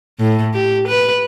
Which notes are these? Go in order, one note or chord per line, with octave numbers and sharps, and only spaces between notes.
A2
G4
B4